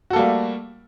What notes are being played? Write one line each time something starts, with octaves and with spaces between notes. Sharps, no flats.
G3 A3 A#3 F#4 A4